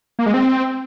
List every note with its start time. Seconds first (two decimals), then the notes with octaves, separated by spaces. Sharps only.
0.19 A#3
0.26 G#3
0.34 C4